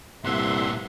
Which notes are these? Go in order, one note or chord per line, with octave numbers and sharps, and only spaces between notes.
C2 G2 A#2 E5 F#5 C6